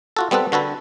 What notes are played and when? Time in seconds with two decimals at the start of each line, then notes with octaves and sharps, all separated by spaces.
0.17 F4 F#4 A4
0.31 G3 B3 C4 A4 B4
0.52 D3 F#4 A4 B4